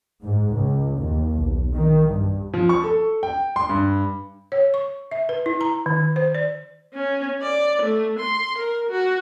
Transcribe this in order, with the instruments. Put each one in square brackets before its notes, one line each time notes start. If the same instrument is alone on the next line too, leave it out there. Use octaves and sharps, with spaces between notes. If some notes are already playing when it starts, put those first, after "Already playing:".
[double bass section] G#2
C#2
D#2
B1
D#3
G2
[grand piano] F3
C#6
A4
G5
C6
G2
[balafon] C#5
C#6
E5
B4
E4
A#5
D#3
C5
D5
[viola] C#4
D5
A3
C6
A#4
F#4